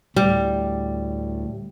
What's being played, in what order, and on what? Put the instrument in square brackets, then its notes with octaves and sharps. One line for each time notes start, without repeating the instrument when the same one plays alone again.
[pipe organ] D2 A2 [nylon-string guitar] G3